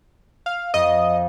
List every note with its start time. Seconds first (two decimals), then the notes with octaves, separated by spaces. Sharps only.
0.46 F5
0.74 F2 D#5